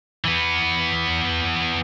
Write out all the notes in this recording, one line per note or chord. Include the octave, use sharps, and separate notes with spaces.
E3 B3